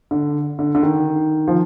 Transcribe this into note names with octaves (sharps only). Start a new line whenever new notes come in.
D3
D3
D3
D#3
F3